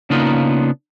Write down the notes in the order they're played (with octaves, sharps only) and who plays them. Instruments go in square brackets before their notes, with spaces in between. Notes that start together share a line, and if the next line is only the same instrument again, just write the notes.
[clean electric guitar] C#3 A#3 B3 D4 D#4 F4